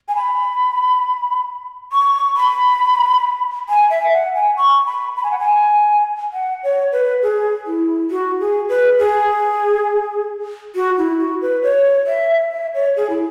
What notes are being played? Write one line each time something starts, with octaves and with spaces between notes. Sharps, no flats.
G#5
B5
C#6
B5
G#5
E5
F#5
G#5
C#6
B5
B5
G#5
F#5
G#5
F#5
C#5
B4
G#4
E4
F#4
G#4
B4
G#4
F#4
E4
F#4
B4
C#5
E5
E5
C#5
G#4
E4